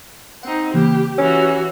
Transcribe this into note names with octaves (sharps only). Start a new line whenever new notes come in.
C4 D#4 F#5
C#3 E3 A#3 G4
E3 C#4 F#4 G4